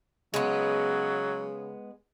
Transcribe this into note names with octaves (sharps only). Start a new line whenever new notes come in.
C#3 F#3 G#3 B3